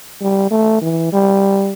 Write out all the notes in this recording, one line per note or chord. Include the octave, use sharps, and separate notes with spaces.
G3
A3
E3
G3